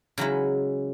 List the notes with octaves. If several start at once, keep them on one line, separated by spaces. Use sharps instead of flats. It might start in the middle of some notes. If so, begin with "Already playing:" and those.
C#3 F#3 G#3 E4